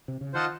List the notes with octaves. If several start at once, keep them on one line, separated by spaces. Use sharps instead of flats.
C3
C#3
D#3 F4 C5 D#5 F#5 A5